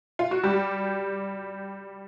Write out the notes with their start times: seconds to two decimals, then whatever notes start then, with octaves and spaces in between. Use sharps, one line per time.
0.19 F4
0.31 F#4
0.44 G3 G4